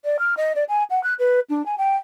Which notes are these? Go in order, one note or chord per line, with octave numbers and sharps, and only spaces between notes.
D5
F6
D#5
D5
G#5
F#5
F#6
B4
D4
G#5
G5